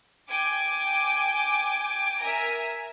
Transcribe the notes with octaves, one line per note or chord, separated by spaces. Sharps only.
G5 G#5 D6 D7
A#4 E5 G#5 A#5